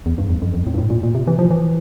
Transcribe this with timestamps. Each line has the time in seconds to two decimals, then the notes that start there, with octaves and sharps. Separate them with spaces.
0.06 E2
0.18 G2
0.30 E2
0.42 F2
0.54 F2
0.67 A2
0.74 G2
0.78 A2
0.90 A#2
1.03 A#2
1.15 C3
1.27 E3
1.39 F3
1.51 E3